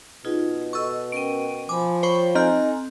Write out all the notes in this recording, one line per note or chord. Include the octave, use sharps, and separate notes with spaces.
B2 D#4 F4 G#4
F#4 A4 D#5 C#6 E6
C#4 A#4 G5 D7 D#7
F3 G#5 B5 D6
C5 C#5 G5 B5 C#6
C4 D#4 A4 G#5 A#5 F6